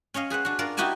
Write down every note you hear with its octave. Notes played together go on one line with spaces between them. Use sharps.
C#4 C#5 D#5 F5
G#4 B4 C5 F#5
D4 F#4
D4 F4 A#4 D5
D#4 E4 F#4 G4 G#5 A5